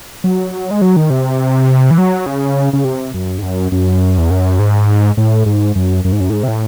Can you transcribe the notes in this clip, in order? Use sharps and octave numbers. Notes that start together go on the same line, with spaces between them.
F#3
G#3
F#3
D#3
C3
E3
F#3
C#3
C#3
C3
F#2
G#2
F#2
F#2
E2
F#2
G#2
A2
G#2
F#2
F#2
G#2
F#2
A2
G#2
C3
A2